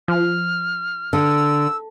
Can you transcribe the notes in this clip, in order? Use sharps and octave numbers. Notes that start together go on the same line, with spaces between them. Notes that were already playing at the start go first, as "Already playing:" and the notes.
F3 F6
D3 E6